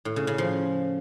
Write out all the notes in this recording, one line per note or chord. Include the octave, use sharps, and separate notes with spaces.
A2
C#3
C#3
F3